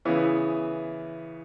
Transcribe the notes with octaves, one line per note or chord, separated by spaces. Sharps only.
C#3 E3 B3 E4